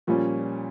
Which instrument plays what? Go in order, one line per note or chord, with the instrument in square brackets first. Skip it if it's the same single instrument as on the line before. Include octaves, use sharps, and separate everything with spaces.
[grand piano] A#2 G3 C#4 [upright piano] F3